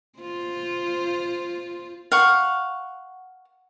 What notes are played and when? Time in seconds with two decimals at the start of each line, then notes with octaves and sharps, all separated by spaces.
0.19 F4 C5
2.12 F5 F#5 C#6